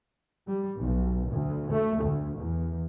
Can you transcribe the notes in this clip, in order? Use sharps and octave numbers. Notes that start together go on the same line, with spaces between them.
G3
B1
D2
A3
D2
E2